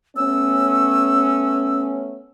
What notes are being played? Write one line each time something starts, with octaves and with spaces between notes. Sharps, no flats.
A3 B3 C#4 E6